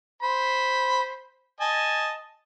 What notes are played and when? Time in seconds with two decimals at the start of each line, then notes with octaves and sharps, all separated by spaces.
0.22 C5 B5
1.61 D#5 G#5 A5